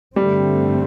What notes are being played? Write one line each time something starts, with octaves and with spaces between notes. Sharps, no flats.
G2 D3 G3 A3 C4